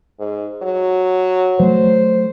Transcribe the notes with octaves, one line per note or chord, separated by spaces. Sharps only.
G#2
F#3
F#3 A3 C5